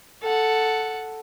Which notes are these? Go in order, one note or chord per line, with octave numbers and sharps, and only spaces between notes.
A4 F#5